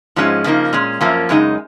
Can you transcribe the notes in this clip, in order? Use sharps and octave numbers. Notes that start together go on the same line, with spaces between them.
G#2 F3 G#3 C#4
C#3 F3 A#3 D#4
A#2 G#3 C#4
F#2 F3 A#3 C#4
F#2 C#3 G#3 D#4